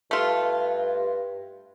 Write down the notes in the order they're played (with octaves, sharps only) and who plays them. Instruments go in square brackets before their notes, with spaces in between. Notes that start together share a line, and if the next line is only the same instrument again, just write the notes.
[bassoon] G2 [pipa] A3 F4